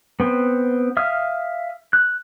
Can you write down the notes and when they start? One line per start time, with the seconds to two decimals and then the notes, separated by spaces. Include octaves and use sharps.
0.20 B3 C4
0.97 E5 F5 D#6 F6
1.93 F#6